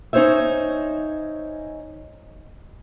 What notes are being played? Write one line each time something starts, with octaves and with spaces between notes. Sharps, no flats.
C#4 D#4 G#4 C5 C#5 E5